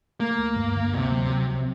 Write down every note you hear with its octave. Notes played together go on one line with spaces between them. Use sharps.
A3 A#3
D2
G2
D3
D2 C3
F#3
F#3
C2